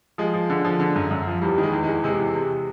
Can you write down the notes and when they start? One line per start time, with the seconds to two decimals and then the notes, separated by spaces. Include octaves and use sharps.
0.18 F3 G#3
0.34 F3
0.50 D3
0.65 F3
0.80 D3
0.96 F#2
1.11 F#2
1.27 F3
1.42 E2 G3
1.58 D#3
1.63 G#3
1.73 E2
1.84 G#3
1.89 E2
2.04 C3 G#3
2.20 E2
2.35 C3